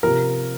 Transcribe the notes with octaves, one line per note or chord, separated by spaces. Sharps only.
C3 F3 A#4